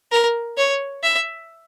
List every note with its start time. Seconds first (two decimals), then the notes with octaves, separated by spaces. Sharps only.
0.11 A#4
0.57 C#5
1.03 E5